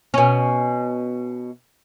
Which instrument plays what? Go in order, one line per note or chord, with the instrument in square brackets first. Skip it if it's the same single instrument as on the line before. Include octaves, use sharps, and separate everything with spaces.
[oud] B2 C#4